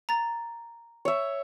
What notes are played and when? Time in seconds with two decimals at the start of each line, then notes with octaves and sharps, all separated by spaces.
0.09 A#5 A6
1.05 C#5 E5